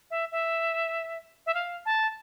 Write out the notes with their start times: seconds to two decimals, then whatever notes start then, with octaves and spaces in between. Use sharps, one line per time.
0.10 E5
0.32 E5
1.46 E5
1.54 F5
1.85 A5